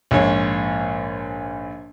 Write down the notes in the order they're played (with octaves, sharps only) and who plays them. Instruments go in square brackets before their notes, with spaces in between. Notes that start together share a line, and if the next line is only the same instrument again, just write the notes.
[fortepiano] A#1 G#2 C#5